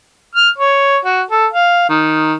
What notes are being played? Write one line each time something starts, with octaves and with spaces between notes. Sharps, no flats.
F6
C#5
F#4
A4
F5
D#3